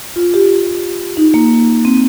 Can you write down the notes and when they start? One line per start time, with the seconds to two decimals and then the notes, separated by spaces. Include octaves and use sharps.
0.16 F4
0.34 G4
1.17 D#4
1.34 A#3
1.85 C4